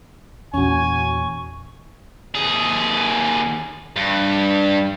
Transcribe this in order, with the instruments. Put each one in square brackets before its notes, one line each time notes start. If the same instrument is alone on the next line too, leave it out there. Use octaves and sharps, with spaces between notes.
[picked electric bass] E2 A#2 [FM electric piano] C#4 F#4 [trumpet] G#5 [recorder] C#6
[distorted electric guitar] D#2 G#4
G2